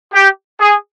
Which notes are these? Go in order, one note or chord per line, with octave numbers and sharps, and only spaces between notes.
G4
G#4